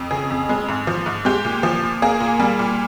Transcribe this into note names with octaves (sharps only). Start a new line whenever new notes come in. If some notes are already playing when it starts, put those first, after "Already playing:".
Already playing: F2
C#3 G#4
F2
G#3
G#2
F3
G#2
G#3 G4
A#2
F3
A#2
A#3 G#4
A#2
G3
A#2